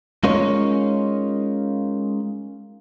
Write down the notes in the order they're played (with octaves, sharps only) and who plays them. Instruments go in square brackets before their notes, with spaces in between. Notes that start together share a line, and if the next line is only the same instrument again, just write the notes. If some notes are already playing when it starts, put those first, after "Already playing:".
[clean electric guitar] G#3 C#4 D#4 F4 A#4 C#5